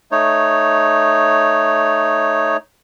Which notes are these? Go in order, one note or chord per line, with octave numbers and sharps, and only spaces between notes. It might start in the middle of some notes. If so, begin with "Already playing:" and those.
A3 D#4 C#5